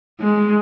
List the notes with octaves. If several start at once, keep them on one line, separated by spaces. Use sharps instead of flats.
G#3